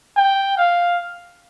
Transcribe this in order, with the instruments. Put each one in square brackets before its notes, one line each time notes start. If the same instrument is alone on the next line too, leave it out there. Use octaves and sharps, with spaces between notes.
[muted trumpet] G5
F5